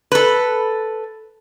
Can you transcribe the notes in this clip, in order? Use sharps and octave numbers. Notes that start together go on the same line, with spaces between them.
A4 B4